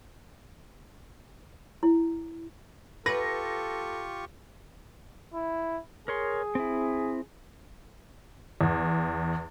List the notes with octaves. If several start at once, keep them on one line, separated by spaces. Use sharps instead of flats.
E4
F4 G4 A4 B4 C#6 A#6
E4
G#4 A#4 C#5 C6
C4 E4
E2